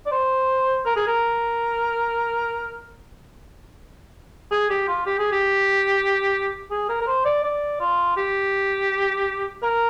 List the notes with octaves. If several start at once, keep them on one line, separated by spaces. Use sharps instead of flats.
D5
C5
A#4
G#4
A#4
G#4
G4
F4
G4
G#4
G4
G#4
A#4
A#4
C5
D5
D5
F4
G4
A#4